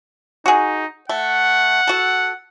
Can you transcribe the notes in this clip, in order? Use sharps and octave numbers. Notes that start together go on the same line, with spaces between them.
D#4 F#4 G#4
A3 F#5
F#4 A4